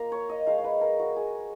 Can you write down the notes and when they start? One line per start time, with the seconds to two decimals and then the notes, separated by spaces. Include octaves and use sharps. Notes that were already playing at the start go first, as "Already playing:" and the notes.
Already playing: A#3 F4 A#5
0.12 C#5
0.30 D#5
0.46 G#3 D#4 F5
0.58 C#5
0.64 B4
0.81 A#4
0.99 F#4
1.16 G#4